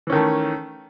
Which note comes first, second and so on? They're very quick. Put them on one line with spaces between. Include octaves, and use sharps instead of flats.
E3 C#4 D#3 A3